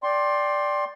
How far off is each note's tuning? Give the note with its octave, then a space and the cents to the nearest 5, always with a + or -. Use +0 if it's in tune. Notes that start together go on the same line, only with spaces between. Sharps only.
D5 +0 G5 +0 C6 +20